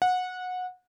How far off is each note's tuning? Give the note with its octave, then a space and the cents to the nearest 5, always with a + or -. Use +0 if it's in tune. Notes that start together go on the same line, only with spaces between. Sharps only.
F#5 -20